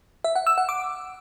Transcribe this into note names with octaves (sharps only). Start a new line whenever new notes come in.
E5
F#5
E6
F#5
D6